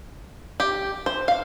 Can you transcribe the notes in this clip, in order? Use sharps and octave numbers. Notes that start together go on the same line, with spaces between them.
G4
C5
F5